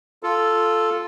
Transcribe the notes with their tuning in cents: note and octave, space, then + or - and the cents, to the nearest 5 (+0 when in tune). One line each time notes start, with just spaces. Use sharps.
F4 +0 A4 +0